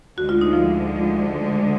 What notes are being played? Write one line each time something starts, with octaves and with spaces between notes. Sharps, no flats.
D2 D3 G#3 F#4
F4
D#4
F3 F4
F3 F4